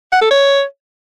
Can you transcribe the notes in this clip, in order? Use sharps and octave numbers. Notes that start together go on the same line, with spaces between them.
F#5
A4
C#5